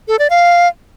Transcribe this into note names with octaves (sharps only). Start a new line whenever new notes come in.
A4
D5
F5